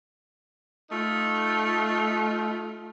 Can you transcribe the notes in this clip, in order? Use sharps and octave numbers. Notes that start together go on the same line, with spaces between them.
A3 D#4 F4